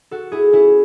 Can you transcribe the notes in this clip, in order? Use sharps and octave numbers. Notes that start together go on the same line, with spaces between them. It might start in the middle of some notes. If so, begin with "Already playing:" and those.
F#4 A4
E4 G#4
C#4 E4